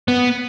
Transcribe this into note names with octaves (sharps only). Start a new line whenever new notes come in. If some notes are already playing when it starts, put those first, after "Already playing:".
B3